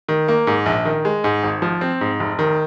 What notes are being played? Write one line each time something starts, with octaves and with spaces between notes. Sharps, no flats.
D#3
A#3
G#2
A#1
D#3
G#3
G#2
G#1
F3
C4
G#2
F1
D#3